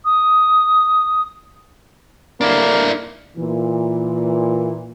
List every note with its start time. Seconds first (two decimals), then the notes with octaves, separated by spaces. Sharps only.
0.05 D#6
2.41 G2 D3 A#3 D4 E4
3.36 A#2 E3